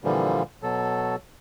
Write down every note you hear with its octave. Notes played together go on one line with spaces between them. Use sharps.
A#2 D3 E3 F3 G3 A#3
B2 F#3 A4